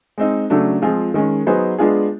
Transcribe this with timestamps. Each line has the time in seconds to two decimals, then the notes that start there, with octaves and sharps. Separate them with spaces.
0.18 G#3 C4 D#4
0.50 C#3 F#3 A3 D4
0.82 F3 G#3 C4 F4 G#4
1.14 D#3 G#3 C#4
1.47 F#3 B3 D#4 G#4 C5
1.79 G#3 B3 D4 F4 G#4